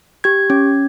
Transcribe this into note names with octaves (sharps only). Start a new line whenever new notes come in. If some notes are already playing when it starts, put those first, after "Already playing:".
G4 G#6
C#4